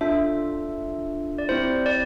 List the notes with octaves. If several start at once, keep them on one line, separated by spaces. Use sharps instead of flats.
D4 F4 A4 E5
D5
C4 E4 G4 C5
D5